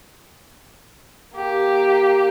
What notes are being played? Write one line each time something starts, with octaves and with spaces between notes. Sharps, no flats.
A#3 G4